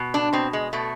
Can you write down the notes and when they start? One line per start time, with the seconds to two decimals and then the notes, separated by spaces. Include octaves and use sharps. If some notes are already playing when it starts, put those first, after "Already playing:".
Already playing: B2
0.14 D4
0.33 B2 C4
0.53 G#3
0.73 B2 A3